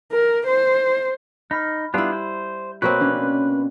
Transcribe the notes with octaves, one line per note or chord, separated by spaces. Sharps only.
A#4
C5
D#4 B5 F6
G3 B3 D4 E4 F4
C5
B2 A#3 C4 B4 C#5 C#6 B6
C#4 D4 C5